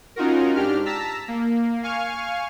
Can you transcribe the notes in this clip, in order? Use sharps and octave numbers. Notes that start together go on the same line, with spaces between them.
C#4 D#4 F4 F#4 A#4
G#2 D4 G4 F6
A5 A#5 E6 B6
A#3
F5 G#5 C#6 F6